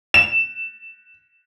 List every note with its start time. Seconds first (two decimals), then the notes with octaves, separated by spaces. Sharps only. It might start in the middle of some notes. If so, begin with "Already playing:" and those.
0.14 E7